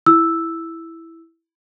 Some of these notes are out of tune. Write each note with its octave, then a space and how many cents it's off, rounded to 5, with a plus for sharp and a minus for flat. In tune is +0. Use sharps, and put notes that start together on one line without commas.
E4 +0 E6 +0